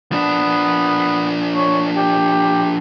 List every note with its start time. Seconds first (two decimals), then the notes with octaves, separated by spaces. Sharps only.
0.12 F3 B3 D4
1.55 C#5
1.96 G4